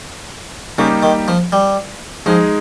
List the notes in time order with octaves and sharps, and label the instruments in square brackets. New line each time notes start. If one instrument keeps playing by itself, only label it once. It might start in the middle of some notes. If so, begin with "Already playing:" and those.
[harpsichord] C#3 [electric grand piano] G3 A#3 D#4 G4
[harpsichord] D#3
F3
G3
[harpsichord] F3 [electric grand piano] G#3 D#4 G#4